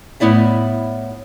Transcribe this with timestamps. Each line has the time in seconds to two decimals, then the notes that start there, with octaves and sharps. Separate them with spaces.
0.20 A2 B3 E4 D5 E5